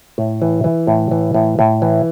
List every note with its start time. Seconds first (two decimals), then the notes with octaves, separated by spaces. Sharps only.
0.18 A2
0.42 E3
0.64 E3
0.87 A2
1.11 E3
1.34 A2
1.59 A2
1.82 E3